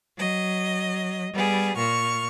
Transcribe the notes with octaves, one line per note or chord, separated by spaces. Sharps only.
F#3 D#5
G3 B3 G#4
A#2 C#6 F6